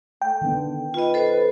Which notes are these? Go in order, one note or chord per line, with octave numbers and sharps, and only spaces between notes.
A3 G5
D3 D#3 B3
F4 B4 D#5
A4 C5